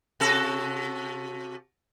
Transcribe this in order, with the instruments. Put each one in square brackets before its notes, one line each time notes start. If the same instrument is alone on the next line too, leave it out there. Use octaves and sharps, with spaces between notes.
[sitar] C3 F#4 A4